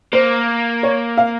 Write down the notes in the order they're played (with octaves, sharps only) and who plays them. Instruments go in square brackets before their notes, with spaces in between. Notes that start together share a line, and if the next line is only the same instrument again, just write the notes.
[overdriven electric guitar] A#3 [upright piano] C5
[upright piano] C#5
F5